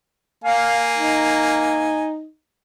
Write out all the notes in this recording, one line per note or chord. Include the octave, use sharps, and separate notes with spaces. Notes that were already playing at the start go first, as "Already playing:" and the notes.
A#3 F5 G#5
D#4